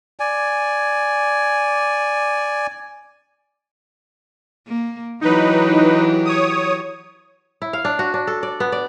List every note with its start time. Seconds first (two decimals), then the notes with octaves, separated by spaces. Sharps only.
0.20 D5 G#5
4.67 A#3
5.21 E3 F#3 D#4 G4 B4
6.25 C#5 D#6
7.62 E4
7.73 F5
7.85 D4
7.99 F#4
8.14 D4
8.27 A4
8.43 D5
8.60 B3
8.72 D5